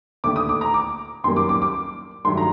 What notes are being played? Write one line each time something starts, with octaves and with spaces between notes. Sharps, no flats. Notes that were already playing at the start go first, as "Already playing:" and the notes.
D#2 D3 A3 D6
D#6
D6
A#5
D6
F#2 D#3 G3 A#3 C6
D6
D6
D6
G2 D#3 F#3 A3 C6
A#5